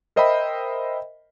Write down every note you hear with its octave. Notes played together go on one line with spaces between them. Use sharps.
A#4 C5 D#5 E5 G5 B5